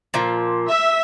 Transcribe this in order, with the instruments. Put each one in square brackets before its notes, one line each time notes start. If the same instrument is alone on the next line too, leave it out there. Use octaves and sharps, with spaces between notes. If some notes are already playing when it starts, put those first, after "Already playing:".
[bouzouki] A#2 F3
[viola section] E5